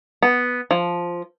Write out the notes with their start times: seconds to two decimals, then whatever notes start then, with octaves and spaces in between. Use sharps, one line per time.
0.23 B3
0.71 F3